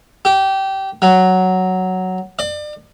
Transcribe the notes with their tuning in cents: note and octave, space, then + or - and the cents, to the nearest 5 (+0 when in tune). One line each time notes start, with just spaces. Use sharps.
G4 -20
F#3 +5
D5 +35